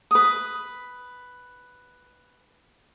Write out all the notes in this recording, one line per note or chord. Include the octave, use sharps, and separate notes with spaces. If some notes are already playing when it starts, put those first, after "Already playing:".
B4 D#6